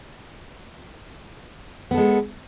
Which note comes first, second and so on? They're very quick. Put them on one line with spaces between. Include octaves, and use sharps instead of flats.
B3 A4 G#3